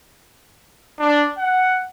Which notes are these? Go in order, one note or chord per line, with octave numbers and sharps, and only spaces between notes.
D4
F#5